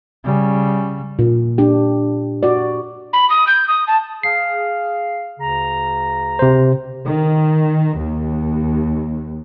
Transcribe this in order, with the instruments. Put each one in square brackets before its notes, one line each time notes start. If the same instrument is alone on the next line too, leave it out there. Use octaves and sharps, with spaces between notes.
[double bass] C#3 G3
[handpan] A#2
D4 G4
F#4 D5
[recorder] B5
D#6
G6
D#6
A5
[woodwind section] G#4 F5 [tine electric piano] C7
[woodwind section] D2 C#3 A#5
[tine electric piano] C3 C5
[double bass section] D#3
D#2